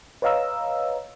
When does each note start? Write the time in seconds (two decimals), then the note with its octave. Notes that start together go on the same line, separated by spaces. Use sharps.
0.22 B4 C#5 D#5 F5 A#5 E6